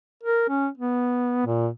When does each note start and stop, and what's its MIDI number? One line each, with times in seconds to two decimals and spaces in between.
0.23 0.44 70
0.49 0.68 61
0.77 1.46 59
1.46 1.69 46